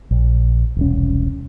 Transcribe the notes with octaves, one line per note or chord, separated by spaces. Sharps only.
A#1
E1 C2 C#4